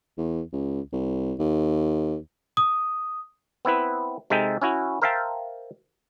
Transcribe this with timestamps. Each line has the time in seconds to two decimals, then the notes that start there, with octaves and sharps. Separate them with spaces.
0.18 E2
0.53 C#2
0.92 C2
1.39 D#2
2.57 D#6
3.65 B3 C4 E4 B4
4.30 C3 G#3 D#4 A4 E5 G5
4.62 C#4 E4 F#4
5.02 A#4 C5 E5 F5 G5 A5